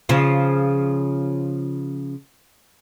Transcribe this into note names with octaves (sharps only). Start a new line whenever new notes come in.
C#3 F3